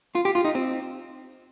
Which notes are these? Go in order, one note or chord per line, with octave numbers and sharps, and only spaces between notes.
F4
G4
F4
D#4
C4